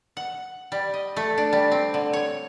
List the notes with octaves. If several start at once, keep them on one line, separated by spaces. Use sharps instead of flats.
F#5
G3
D#5
A3
D4
G3
C4
D3
C#5